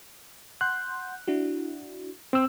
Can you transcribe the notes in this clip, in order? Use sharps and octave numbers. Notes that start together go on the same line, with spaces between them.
F#5 C6 F#6 G6
D4 E4 F#4
C4 E6